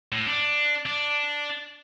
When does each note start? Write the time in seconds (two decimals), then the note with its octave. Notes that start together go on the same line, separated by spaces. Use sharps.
0.12 A2
0.27 D4
0.86 D4